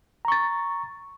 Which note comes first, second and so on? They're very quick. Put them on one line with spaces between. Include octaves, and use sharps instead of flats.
A#5 C#6 A6